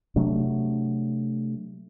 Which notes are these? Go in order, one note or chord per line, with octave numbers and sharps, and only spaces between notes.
C3 F#3 A3 D4